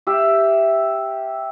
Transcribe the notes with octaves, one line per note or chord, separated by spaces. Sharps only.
G4 E5 F5